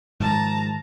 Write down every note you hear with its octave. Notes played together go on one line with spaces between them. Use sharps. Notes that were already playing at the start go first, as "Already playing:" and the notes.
G#2 D#3 F3 A5 A#5